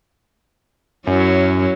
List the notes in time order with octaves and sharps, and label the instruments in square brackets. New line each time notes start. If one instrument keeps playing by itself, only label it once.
[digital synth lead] F#2 [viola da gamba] F#3 C#4 E4